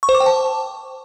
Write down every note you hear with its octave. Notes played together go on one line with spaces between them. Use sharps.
C#6
C5
D6
G5
A5